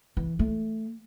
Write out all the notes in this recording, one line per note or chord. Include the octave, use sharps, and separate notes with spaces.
E3
A3